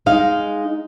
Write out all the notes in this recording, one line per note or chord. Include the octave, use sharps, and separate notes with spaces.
G#3 D#4 F5